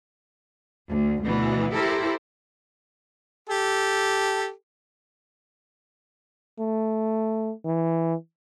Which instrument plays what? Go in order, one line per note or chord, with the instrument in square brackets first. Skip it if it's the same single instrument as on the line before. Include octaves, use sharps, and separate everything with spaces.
[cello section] D2
D2 B2 E3 B3
E4 G4 A4 A#4 C5
[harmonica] G4 A4
[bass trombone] A3
E3